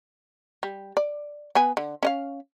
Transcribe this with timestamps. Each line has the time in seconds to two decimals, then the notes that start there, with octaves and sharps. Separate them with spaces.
0.63 G3
0.97 D5
1.55 B3 B4 G#5
1.77 D3
2.03 C#4 D#5 F5